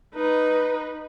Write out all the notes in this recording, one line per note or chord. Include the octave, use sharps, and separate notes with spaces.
D#4 B4